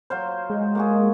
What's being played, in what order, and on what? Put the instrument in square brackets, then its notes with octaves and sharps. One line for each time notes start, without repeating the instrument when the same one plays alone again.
[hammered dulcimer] F#3 F4 C5
[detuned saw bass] G#3
[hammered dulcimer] A#3 F#4 G#4